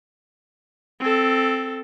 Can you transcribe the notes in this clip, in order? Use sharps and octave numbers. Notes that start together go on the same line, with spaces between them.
C4 A4